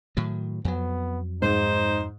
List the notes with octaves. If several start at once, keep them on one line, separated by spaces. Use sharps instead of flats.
A2 D#3 F#3
F2 F#3 B3
G#2 D#4 C5